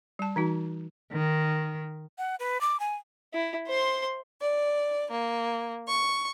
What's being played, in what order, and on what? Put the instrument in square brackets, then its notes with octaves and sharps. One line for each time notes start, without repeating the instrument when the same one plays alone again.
[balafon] G3 A5
E3 D#4 F#4
[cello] D#3
[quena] F#5
B4
D6
G#5
[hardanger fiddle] E4
C5 C6
[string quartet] D5
A#3
C#6